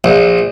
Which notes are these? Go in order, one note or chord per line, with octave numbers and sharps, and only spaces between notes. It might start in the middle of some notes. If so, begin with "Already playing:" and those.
A#1